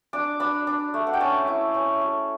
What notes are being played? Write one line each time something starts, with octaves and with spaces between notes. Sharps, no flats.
D4 D6
D4 B5
D4
A3
F#5
G5
C#4 A5
E4
C#4
A3